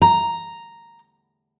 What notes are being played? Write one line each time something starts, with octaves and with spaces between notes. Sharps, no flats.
A#5